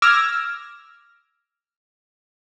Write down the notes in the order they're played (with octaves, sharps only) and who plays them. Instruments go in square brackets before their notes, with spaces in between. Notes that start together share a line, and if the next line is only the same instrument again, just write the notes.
[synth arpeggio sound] D6 E6 F6 G#6 A#6